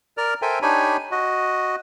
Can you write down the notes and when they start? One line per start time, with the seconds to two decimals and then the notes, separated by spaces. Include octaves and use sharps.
0.17 A#4 D5 F6
0.42 A4 A#4 C5 E5 G5 G#5
0.62 D4 D#4 G4 C#5 G#5 B5
1.11 F#4 D#5